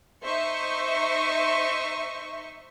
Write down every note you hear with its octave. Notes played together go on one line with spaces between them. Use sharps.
D#4 C5 E5 C#6